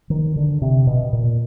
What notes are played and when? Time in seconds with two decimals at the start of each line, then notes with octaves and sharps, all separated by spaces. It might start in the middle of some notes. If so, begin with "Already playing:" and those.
0.10 D#3
0.36 D3
0.62 C3
0.87 B2
1.13 A#2